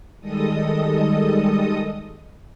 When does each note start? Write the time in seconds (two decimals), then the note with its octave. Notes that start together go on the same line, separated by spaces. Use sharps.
0.20 D#3 G3 G#3 A4 D#5 D#6